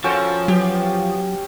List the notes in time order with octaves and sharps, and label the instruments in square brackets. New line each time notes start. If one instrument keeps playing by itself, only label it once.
[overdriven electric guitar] F3 [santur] C#4 F#4 G5 [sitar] F4 A4 A#4
[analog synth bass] F#3 [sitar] B3 G4